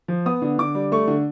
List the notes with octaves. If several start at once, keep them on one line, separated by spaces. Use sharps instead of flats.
F3
B3 D#6
D3
D3 D6
G3
A3 C#6
D3